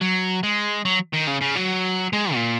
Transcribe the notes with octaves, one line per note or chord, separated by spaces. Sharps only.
F#3
G#3
F#3
D#3
C#3
C#3
F#3
G#3
A#2